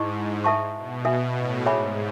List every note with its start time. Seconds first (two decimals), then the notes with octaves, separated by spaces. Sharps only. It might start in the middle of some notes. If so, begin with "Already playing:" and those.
Already playing: G#2 E4 G#4 D#5 A5 C#6
0.14 G#2
0.44 A4 E5 A5 C#6
0.75 B2
1.05 A4 E5 G#5
1.35 A2
1.66 G#2 G#4 C#5 E5 G#5 B5